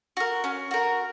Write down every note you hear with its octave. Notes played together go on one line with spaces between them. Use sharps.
F#4 A#4
C#4
F#4 A#4